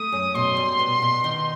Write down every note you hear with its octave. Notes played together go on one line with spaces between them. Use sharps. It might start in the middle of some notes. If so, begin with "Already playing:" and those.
Already playing: A3 D#6
F#2
B2 C6
G3
B3
B2
D#3